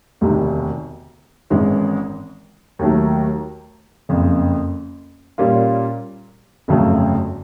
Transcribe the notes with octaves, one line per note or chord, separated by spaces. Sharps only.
E1 D2 C3 D#3
G#1 G#2 E3 G#3 C#4
D#2 D#3 F#3 A3
F#1 F2 C#3
A#2 G3 A#3 C#4 F4
G1 F2 C#3 F#3 A3